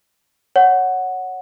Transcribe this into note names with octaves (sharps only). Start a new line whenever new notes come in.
C#5 F#5